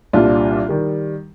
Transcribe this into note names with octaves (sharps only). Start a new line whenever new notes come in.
C2 A#2 G3 D4 F4
D#3 G3